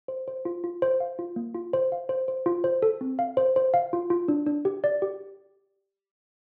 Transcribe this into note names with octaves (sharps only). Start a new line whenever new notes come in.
C5
C5
F4
F4
C5
F5
F4
A#3
F4
C5
F5
C5
C5
F4
C5
A4
C4
F5
C5
C5
F5
F4
F4
D4
D4
G4
D5
G4